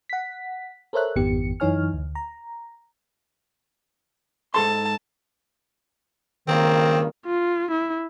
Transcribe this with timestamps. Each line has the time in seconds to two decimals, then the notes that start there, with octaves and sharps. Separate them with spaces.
0.09 F#5 B6
0.93 A4 A#4 C5 C#5 E5 F#6
1.16 G#1 F2 D#3 B3 G4 C#7
1.60 F#2 E3 D#4 C#5 G#5 F6
1.93 D2
2.15 A#5
4.54 G#2 A4 A5 C6
6.48 C#2 G2 D#3 A#3 C4
7.26 F4
7.71 E4